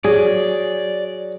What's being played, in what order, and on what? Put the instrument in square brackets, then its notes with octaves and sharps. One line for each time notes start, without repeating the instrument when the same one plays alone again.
[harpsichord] F#3 [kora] G#4 [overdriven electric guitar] D5